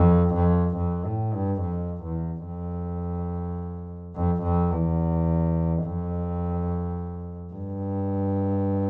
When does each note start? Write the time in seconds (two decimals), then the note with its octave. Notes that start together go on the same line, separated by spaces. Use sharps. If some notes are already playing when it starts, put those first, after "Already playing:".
Already playing: F2
0.35 F2
0.77 F2
1.05 A2
1.34 G2
1.62 F2
2.04 E2
2.46 F2
4.15 F2
4.43 F2
4.71 E2
5.84 F2
7.53 G2